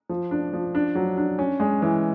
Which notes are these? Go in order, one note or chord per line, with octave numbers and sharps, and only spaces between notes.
F3
D4
F3
D4
F#3
D4
C#4
G#3
E3